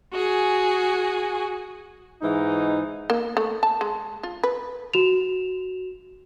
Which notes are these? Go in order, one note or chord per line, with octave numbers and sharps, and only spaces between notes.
F#4 G#4 G#5
G#2 E3 D#4
A#3
A3
A5
G#3
F4
B4
F#4 E7 F7